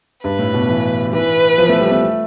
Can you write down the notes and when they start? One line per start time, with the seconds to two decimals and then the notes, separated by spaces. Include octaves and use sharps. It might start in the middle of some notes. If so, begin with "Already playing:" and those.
0.24 G2 B4
0.39 A2
0.54 B2
0.68 E3
1.13 E3 B4
1.58 F3
1.69 A3
1.80 G3
1.91 A3